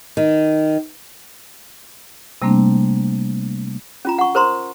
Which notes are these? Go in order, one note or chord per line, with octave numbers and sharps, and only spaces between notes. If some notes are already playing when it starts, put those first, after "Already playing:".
D#3
C3 G3 A3 A#3 C4 D4
C#4 F4 A#5
F#5 C#6
A#4 C5 A#5 C6